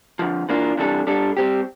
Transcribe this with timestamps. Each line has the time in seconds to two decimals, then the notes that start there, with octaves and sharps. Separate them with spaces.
0.19 F2 D3 F3
0.49 E3 A#3 D4 F4
0.77 C3 E3 G3 D4 A4
1.07 G3 D4 A4
1.37 G3 C4 G4